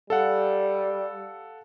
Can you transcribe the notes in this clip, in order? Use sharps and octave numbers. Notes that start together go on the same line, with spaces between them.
G3 A4 F5 F#5